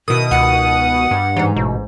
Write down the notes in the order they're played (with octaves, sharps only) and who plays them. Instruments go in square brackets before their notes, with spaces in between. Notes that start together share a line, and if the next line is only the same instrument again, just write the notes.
[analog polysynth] B2 D#6 [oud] D#3 E4
[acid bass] C#2 [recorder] F#5
[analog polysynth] G2
[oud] G#2 D#4 [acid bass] E3
[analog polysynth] A1 [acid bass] B2